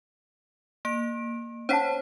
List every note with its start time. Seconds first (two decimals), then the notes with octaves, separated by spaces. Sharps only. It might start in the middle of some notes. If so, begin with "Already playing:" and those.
0.85 A#3 D7
1.69 C#4 C5 C#5 F#5 A5 B6